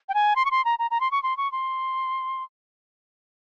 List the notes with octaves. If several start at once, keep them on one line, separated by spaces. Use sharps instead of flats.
G5
G#5
C6
C#6
C6
A#5
A#5
A#5
C6
C#6
C6
C#6
C6